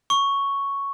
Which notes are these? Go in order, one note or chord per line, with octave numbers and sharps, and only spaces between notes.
C#6